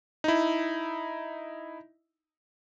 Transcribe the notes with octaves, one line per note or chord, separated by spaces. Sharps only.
D#4 E4